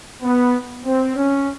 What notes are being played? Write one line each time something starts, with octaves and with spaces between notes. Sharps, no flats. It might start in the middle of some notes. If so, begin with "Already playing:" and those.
B3
C4
C#4